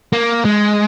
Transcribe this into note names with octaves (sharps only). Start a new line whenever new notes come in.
A#3
G#3